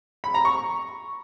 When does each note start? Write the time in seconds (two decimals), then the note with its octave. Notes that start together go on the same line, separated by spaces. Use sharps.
0.24 B5
0.34 A#5
0.45 C#6